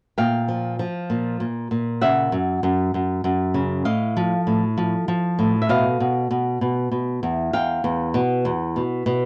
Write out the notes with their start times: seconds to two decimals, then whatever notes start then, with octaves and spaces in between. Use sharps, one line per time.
0.18 A#2 F5 G5
0.48 F3
0.79 F3
1.10 A#2
1.40 A#2
1.71 A#2
2.01 C#3 E5 F#5
2.32 F#2
2.63 F#2
2.94 F#2
3.24 F#2
3.54 C#3
3.85 A2 D#5 F5
4.17 F3
4.47 A2
4.78 F3
5.08 F3
5.39 A2
5.62 E5
5.69 B2 D#5 F5
6.00 B2
6.31 B2
6.61 B2
6.92 B2
7.23 E2
7.53 E2 F5 G5
7.84 E2
8.14 B2
8.45 E2
8.76 B2
9.06 B2